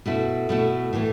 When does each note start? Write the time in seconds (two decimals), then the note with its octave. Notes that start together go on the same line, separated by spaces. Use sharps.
0.06 B2 A3 E4
0.49 B2 A3 E4
0.93 A2 E3 A3